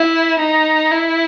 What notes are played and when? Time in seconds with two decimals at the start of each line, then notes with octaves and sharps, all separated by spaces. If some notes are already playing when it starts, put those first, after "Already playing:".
Already playing: E4
0.39 D#4
0.91 E4